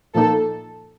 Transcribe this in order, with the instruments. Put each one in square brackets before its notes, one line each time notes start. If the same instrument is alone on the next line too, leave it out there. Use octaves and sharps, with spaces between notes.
[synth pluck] A#2 F3 A#3 D#4 [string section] A4